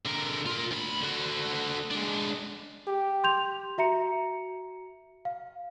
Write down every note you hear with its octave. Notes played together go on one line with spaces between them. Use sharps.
D3 A#4
F4 A#4
D2 B5
D3 F#4
G#3 D4
G4
C6 G6 F7
F#4 E5 A#5 C#7
F5